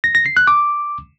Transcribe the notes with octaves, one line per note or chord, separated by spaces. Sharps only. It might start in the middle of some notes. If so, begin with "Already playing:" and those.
A#6
A#6
C7
F#6
D6